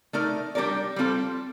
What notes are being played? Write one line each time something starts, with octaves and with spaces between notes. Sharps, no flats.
A3 D#4 A#4 D5
G3 D4 G4 A#4 D5
G3 C4 F4 A4